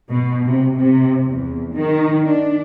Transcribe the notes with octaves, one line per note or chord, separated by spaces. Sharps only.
B2
C3
C3
E2
D#3
D4